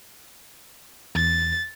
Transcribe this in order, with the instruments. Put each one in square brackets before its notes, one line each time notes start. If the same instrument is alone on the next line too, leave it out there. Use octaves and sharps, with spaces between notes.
[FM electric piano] E2 [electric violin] A6